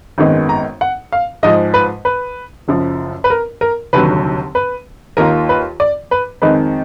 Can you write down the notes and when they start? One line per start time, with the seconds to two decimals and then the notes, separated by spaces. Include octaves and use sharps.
0.18 G#1 F#2 D#3 G#3 B3
0.49 A#5
0.81 F#5
1.12 F5
1.43 G#2 F3 G#3 D#5
1.74 B4
2.05 B4
2.68 F#1 F#2 F3
3.24 B4
3.30 A#4
3.61 A#4
3.93 F1 D#2 D3 F#3 B4
4.55 B4
5.17 D#2 D#3 A#3 F4 A#4
5.49 B4
5.80 D5
6.11 B4
6.42 F2 D#3 G#3 D#4 B4